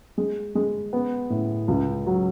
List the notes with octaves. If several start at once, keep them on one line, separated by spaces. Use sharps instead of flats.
G#3
G#3
B3
A2
C#2
F#3